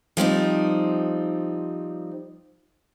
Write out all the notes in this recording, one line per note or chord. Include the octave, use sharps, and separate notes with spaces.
F3 G3 C4 D#4